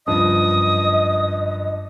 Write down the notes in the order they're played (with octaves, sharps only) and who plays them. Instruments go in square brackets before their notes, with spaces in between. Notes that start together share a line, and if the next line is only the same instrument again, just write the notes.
[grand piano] F#1 G2 F3 [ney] D#5 [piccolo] D#6